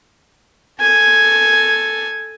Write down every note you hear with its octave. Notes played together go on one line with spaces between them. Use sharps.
A4 G#5